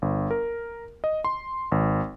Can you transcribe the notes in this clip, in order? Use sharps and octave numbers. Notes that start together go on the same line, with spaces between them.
G1
A#4
D#5
C6
G#1